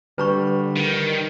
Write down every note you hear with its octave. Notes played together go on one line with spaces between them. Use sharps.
D3 G3 B4 A#5 C#6
D#3